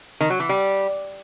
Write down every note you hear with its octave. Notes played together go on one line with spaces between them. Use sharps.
D#3
F#3
E3
G3